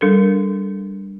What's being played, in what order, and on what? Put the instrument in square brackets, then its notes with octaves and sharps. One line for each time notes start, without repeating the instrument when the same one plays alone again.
[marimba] G3 D4 A4 A#4